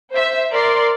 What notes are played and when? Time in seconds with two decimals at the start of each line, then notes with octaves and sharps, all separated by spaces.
0.12 C5 E5
0.53 A#4 D5 C6